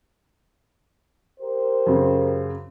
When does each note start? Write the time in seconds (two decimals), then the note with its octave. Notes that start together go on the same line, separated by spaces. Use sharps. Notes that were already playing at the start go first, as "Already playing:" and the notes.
1.40 G4 A#4 C5
1.86 F#2 C#3